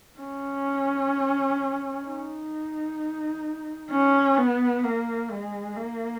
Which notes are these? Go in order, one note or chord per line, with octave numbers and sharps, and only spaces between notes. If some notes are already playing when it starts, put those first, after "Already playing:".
C#4
D#4
C#4
B3
A#3
G#3
A#3